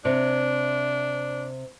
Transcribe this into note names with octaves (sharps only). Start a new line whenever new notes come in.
C3 D4